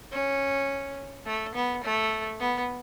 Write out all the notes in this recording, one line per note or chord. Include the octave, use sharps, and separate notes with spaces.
C#4
A3
B3
A3
B3